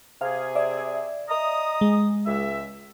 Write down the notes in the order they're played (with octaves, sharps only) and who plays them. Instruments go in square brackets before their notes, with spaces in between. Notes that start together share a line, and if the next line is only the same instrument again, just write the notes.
[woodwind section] C3 G#4 [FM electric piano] F5
[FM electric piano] D5 E5
[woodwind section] D#5 A#5 D#6
[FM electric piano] G#3
[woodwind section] C#2 E5